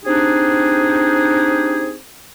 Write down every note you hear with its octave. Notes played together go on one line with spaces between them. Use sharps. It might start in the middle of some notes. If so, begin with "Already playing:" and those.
C4 D4 D#4 G4 G#4